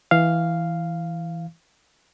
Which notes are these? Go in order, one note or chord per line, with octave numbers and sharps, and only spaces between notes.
E3 F5